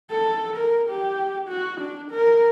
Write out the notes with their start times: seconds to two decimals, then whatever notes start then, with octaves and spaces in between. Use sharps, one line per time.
0.11 A4
0.56 A#4
0.90 G4
1.48 F#4
1.81 D4
2.11 A#4